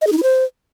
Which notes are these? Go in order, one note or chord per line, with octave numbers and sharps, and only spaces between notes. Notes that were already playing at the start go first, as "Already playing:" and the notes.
D#5
G#4
D#4
E4
C5